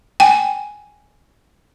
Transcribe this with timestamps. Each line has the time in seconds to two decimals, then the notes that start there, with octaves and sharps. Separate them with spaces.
0.20 G5 G#5